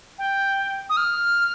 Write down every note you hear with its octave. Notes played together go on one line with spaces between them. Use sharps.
G5
D#6
F6